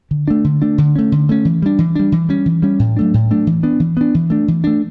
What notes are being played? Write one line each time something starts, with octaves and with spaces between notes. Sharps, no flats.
D3
A3 D4
D3
A3 D4
D3
A3 C#4
D3
A3 C#4
E3
G3 D4
E3
G3 D4
E3
G3 C#4
E3
G3 C#4
A2
F#3 A3 D4
A2
F#3 A3 D4
E3
B3 D4
E3
B3 D4
E3
A3 D4
E3
A3 D4